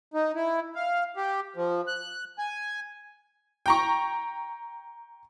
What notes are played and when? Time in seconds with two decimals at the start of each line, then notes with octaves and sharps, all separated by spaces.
0.14 D#4
0.36 E4
0.75 F5
1.17 G4
1.56 F3
1.87 F#6
2.39 G#5
3.66 G5 A#5 C#6